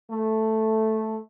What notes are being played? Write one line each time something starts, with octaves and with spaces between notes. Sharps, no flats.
A3